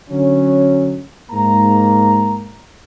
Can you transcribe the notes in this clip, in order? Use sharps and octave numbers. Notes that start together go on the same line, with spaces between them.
D3 F#3 C#4
G#2 A#3 A#5